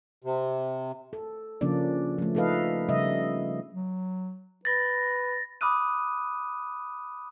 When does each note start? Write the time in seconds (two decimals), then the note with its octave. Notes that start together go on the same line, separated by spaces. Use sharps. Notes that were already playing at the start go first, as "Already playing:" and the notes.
0.24 C3
1.13 A4
1.61 C#3 F3 A#3 C#4 D4 D5
2.18 F3 A3
2.35 F3 D#4 A4 B4 D#5 F5
2.88 C#3 G3 D#5 E5
3.73 F#3
4.65 B4 A6 A#6
5.61 B5 D6 D#6 F6 F#6 D#7